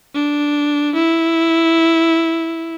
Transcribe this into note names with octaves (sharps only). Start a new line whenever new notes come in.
D4
E4